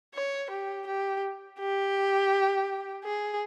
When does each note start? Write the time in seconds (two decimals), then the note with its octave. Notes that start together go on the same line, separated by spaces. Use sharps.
0.14 C#5
0.50 G4
0.87 G4
1.59 G4
3.04 G#4